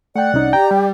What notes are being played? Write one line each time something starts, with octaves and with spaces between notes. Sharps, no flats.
A3 D5 F#5 G5
C2 C#4 D#4
G4 G5 A#5
G3